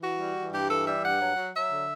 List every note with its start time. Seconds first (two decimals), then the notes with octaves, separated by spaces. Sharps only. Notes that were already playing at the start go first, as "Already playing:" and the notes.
0.01 E3 F#4
0.18 G3
0.35 E3
0.52 G2 G4
0.69 E3 A4
0.86 G3 E5
1.02 G2 F#5
1.20 F#3
1.36 F#3
1.54 F#3 E5
1.70 D3